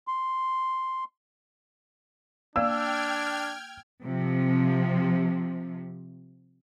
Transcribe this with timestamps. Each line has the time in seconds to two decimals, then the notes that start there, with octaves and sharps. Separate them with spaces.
0.07 C6
2.56 A#3 D4 D5 F5 G5 E6 F6 G#6
4.03 C3 F3